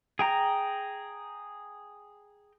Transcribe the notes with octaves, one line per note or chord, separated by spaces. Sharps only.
G#4 G5 A#5